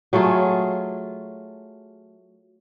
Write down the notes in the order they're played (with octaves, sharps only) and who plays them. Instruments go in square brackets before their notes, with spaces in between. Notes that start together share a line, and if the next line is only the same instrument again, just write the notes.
[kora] F#3 A3 F4 G#4